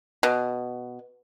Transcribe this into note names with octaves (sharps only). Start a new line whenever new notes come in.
B2